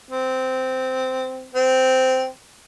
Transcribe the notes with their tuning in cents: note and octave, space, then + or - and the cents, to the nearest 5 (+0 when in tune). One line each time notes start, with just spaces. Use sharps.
C4 -15
C4 -10